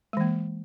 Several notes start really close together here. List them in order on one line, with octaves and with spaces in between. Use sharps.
G#3 E3 A#3